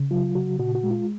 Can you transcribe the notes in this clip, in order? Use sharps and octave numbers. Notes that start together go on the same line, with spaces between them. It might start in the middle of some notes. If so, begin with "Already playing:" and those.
Already playing: C#3
F#3 F4
C#3 F#4
A#2 F#4
F#4
G#3
F4